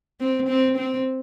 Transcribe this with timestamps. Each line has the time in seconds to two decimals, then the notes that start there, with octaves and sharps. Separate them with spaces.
0.20 C4
0.49 C4
0.77 C4